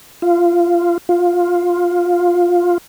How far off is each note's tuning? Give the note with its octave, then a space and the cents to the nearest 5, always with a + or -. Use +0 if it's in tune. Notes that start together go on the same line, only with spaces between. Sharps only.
F4 -15
F4 +10